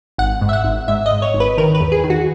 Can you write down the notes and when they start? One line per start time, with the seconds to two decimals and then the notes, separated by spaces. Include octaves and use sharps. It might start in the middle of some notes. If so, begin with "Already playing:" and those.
0.18 G#1 F#5
0.41 G#2
0.49 E5
0.53 F#5
0.64 G#1
0.88 G#2 E5
1.06 D#5
1.11 G#2
1.22 C#5
1.34 G#1
1.40 B4
1.57 D#3 A#4
1.75 B4
1.81 E2
1.92 G#4
2.04 D#3
2.10 F#4